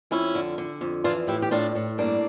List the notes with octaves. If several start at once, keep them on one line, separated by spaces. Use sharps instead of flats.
F2 C#4 E4
D3
D3
F2
E3 D4 F4
A2 E4 G4
G4
A2 D4 F4
A2
G2 A#3 D4